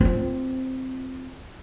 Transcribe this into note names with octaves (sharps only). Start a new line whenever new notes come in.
C4 F4